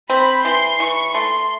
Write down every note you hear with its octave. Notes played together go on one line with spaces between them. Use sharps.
C4 B5
E3 C6
E3 C#6
A3 C6